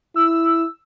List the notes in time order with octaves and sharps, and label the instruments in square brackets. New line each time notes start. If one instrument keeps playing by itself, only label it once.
[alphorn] E4 [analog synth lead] E6